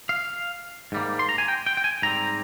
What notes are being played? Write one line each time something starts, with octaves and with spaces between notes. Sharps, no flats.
F5
G#2 G3 A#3
C6
A#5
G#5
G5
G5
G5
G#5
G#2 G3 C4 A#5